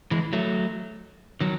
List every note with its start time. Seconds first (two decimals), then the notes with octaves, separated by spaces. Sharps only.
0.11 E3 G#3
0.33 F#3 A3
1.41 D#3 F#3